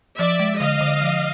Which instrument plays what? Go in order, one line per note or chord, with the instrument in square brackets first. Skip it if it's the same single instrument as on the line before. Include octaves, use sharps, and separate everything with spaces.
[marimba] F3 [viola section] D5 E5
[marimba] G#3
[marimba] D3 [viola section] D#5 F5
[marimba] D3
F3